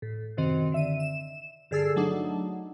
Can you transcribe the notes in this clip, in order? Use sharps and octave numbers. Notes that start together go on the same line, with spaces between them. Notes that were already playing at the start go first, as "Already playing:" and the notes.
A2
F#2 C3 D#3 C4
D3 E5 D#7
E7
G2 D3 G#4 A4 E6 C7
F#3 A3 D4 D#4